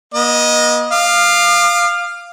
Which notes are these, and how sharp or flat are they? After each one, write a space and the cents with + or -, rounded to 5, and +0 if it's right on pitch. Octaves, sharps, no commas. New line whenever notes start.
B3 -45 D#5 +0
F5 +0 D6 +45